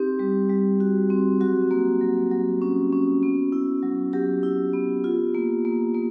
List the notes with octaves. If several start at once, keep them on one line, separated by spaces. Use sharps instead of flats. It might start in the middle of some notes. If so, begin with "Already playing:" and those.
Already playing: C4 D#4 G4
G3
G3
F#4
C4
F#3 F#4
A#3
F#3
F#3
C#4
C#4
B3
E4
F#3
F#3 G4
E4
B3
F4
A#3
A#3
A#3